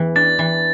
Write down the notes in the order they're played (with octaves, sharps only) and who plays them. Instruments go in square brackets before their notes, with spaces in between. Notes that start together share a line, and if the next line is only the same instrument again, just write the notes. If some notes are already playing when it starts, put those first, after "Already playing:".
Already playing: [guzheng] E2 E3
[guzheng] D4 [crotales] A6
[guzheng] E3